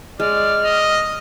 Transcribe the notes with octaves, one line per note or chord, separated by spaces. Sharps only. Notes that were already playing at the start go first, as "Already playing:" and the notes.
G#3 D5 F6
D#5